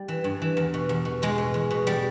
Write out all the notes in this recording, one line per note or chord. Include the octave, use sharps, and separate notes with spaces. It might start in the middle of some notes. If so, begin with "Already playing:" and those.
Already playing: G3
E3
G2
E3
E2
B2
E2
B2
E2 G#3
B2
E2
B2
G3